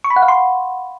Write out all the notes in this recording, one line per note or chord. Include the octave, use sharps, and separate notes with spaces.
C#6
B5
F#5
F5
C6